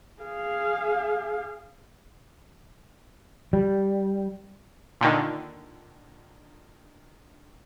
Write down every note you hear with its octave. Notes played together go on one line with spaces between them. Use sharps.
G#4 F5
G3
A#2 D3 D#3